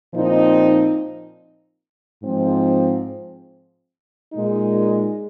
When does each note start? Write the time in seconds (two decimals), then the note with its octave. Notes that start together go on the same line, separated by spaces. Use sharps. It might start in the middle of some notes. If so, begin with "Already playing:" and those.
0.13 A#2 F3 C4 D#4
2.23 G#2 F3 C4
4.33 A#2 G#3 D#4